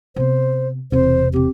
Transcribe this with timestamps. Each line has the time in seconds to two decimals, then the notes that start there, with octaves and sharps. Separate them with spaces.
0.16 C3 B3 C5
0.92 E1 C3 E3 C4 C5
1.33 D3 C4 G4